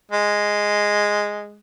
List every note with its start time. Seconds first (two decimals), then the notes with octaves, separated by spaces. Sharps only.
0.12 G#3